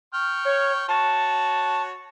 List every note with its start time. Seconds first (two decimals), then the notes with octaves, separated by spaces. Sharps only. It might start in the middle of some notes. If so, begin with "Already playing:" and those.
0.14 G5 C#6 F6
0.45 C#5
0.89 F#4 C#5 A5